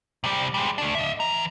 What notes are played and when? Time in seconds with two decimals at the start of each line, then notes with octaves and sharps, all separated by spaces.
0.24 C3 G3
0.54 G3 G#3
0.78 A3 D4
0.95 D#5 E5
1.20 E3 A#5